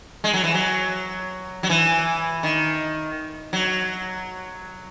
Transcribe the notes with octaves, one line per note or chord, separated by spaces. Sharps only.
G#3
F#3
E3
F#3
F#3
E3
D#3
F#3